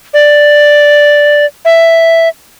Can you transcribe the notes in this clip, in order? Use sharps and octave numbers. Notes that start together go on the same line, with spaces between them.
D5
E5